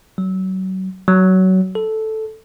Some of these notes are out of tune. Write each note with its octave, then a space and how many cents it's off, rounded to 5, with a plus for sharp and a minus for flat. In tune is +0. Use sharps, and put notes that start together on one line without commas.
F#3 +30
F#3 +20
A4 -5